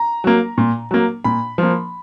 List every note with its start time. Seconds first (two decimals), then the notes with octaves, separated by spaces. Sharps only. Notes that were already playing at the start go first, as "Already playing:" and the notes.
Already playing: A#5
0.24 F#3 A#3
0.58 A#2
0.91 F#3 A#3
1.24 A#2 B5
1.58 F3 A#3